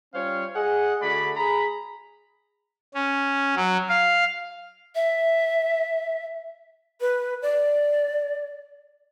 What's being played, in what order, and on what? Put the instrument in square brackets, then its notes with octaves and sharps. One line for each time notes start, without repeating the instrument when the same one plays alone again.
[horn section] G3 C#4 F4 C5 C#5 F5
G#4 D#5 F#5
D3 A3 F#4 G#4 D5 B5
G#4 A#5 B5
[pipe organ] C#4
F#3
F5
[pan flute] E5
[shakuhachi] B4
D5